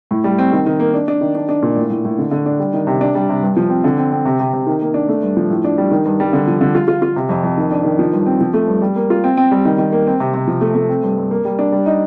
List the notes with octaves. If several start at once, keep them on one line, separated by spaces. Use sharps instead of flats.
A2
G3
C4
D#3
D#3
A#3
D4
D4
D#3
D4
D4
A#2
A2
A2
A2
D3
D3
D4
G3
D#3
C3
D4
G3
C3
G2
F3
C4
D3
C4
C4
C3
C3
C3
D#3
A#3
D4
A3
G2
F3
A2
D4
G3
D#3
G2
G3
D3
F3
D3
F4
F4
F4
C3
F2
F2
D#3
D4
D#3
F3
G2
C4
F3
A3
G2
G3
A#3
F4
C4
C4
G3
D#3
D#3
A#3
C4
C3
C3
F3
A3
A3
C4
G2
G2
A#3
G3
D4
G3
D#4